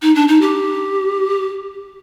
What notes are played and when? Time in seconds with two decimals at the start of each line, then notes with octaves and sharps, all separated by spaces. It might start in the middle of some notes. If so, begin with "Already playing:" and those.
0.02 D#4
0.15 D4
0.28 D#4
0.41 G4